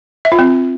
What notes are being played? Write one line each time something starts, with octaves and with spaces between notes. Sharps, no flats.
E5
F4
C4